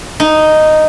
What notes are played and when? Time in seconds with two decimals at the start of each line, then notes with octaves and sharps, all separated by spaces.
0.20 D#4